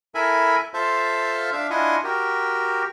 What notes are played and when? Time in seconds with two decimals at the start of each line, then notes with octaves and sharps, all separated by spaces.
0.15 E4 A4 A#4 E5 G#5 B5
0.74 F4 A4 C5 E5 F5 A5
1.52 D4 E5 F5
1.70 D4 E4 F4 D#5 F#5 G#5
2.04 F#4 G4 A#4